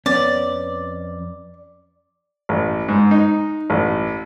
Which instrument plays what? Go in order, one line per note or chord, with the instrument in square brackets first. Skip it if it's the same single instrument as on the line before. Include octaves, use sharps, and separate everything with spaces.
[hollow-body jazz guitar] F2 B3 C#4 [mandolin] D5
[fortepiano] A1
G#2
D#4
A1